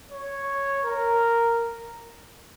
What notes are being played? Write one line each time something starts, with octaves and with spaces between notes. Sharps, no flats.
C#5
A#4